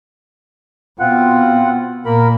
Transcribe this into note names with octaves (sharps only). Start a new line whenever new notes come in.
B2 C4 F4 F#5
A#2 A#4 B5